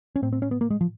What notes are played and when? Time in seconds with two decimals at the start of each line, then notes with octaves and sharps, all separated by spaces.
0.16 C#4
0.22 A2 C4
0.33 C4
0.42 C#4
0.51 B3
0.61 A#3
0.70 G#3
0.81 F3